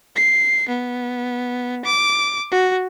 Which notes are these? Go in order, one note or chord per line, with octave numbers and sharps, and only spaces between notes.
C7
B3
D6
F#4